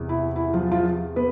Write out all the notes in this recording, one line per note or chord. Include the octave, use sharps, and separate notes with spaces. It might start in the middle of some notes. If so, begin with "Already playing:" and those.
Already playing: E2 C3 E3
E4
E4
F3 F4
F3 F4
B3 B4